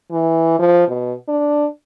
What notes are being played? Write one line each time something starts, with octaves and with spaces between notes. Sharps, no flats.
E3
F3
B2
D4